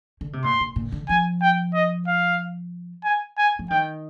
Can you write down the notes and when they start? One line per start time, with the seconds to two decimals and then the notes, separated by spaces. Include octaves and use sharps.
0.21 D3
0.33 C3
0.44 A#2 C6
0.60 A#2
0.76 A#2
0.92 D3
1.09 F3 G#5
1.42 G5
1.74 D#5
2.08 F5
3.04 G#5
3.38 G#5
3.59 F3
3.70 D#3 G5